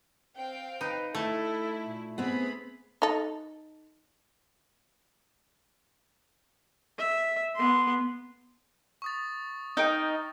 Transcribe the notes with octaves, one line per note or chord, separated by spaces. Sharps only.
C4 F5 G5
D#4 B4
A3 E4 A4
A#2
B3 C4 G#4 B5
D#4 A4
E5
B3 C6
C#6 D#6 A6
D#4 A#4 G5